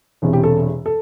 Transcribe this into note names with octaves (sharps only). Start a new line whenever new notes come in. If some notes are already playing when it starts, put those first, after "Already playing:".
E1 E2 C3
G4
A4
A4